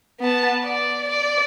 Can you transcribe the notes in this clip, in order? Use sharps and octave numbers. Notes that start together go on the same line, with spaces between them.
B3 A5
D5
D5